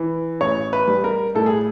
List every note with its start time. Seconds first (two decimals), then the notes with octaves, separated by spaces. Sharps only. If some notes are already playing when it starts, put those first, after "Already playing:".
Already playing: E3
0.41 A1 C#5
0.73 B4
0.88 G3
1.04 A#4
1.35 A2 A4
1.46 G#4